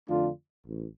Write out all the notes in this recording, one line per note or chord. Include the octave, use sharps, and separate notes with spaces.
F2 D3 A3 D4 F4
A1